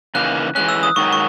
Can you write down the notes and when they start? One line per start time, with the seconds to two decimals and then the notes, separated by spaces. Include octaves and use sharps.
0.15 C#3 E3 A#3 D#4 F#6
0.55 E3 G#3 C#4 F#6
0.69 E6
0.83 D#6
0.96 G#2 D#3 F#3 C#6
1.13 C#6